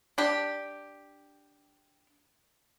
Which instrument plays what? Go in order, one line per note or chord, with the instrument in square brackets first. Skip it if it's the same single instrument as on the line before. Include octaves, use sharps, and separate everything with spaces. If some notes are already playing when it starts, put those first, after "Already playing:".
[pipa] D4 G4